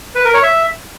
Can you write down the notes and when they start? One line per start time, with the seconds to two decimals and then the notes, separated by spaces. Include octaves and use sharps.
0.15 B4
0.25 A#4
0.34 C#5
0.43 E5